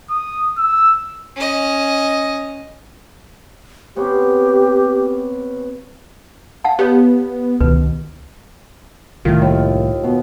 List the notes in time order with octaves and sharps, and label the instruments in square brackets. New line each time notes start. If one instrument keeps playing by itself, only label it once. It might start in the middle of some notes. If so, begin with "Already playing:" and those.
[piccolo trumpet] D#6
E6
[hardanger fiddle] C#4 D#5
[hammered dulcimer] C3 B3 C#4 [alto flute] G4
[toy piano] F5 F#5 A5
[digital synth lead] B3 [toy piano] G4 C#5
[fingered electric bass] C#2 D#3 [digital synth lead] B2 [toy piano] B4
[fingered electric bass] C2 A2 [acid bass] D#3 [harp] F4
[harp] D#2
B2